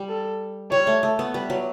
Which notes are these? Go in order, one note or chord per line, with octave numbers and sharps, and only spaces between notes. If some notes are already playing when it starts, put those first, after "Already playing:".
Already playing: G3
A4
G3 C#5
A3
A3
B3
G3 B4
F#3